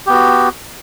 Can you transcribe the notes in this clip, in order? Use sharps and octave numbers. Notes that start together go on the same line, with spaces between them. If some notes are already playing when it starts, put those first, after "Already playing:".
B3 F#4 G4